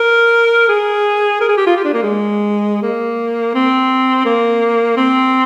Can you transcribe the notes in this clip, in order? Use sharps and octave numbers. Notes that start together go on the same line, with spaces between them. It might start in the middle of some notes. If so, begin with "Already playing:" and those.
Already playing: A#4
G#4
A#4
G#4
G4
F4
G4
D4
A#3
G#3
A#3
C4
A#3
C4